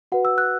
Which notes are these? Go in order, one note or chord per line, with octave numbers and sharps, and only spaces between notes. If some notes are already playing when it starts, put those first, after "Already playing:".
F#4 B4 F#5
E6
F#6